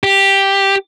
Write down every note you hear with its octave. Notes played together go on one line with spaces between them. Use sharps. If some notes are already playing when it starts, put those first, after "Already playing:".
G4